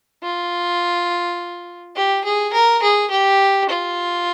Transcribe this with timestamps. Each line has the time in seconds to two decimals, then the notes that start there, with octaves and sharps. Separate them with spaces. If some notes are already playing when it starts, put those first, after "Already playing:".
0.24 F4
1.96 G4
2.25 G#4
2.54 A#4
2.83 G#4
3.11 G4
3.70 F4